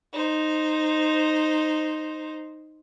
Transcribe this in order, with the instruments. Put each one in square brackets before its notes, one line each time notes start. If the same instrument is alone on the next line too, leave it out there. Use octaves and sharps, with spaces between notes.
[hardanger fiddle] D#4 C5